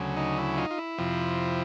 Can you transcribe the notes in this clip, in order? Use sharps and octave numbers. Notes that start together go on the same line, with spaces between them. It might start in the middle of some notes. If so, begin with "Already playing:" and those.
Already playing: D2 C#3 F#3
D#4
E4
D#4 F4
F4
E4
F2 C3 F3